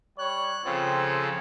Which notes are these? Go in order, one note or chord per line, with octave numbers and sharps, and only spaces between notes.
G3 C#5 F#6
C#3 F3 C4 A4